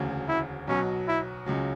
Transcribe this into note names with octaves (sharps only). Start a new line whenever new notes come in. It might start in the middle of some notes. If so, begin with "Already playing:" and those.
Already playing: E1 D2 C#3
E4
B1 B2 F#3 C#4
E4
C#2 C#3 F#3